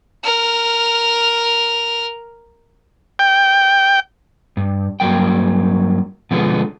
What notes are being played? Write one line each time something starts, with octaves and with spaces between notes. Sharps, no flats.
A#4 F6
G5
G2
G2 F#3 G#3 A#3 G5
B2 D3 F3 G#3 A3 B3